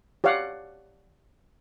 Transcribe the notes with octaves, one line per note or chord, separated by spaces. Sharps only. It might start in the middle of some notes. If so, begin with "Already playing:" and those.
G4 C#5 D5 F5 F#5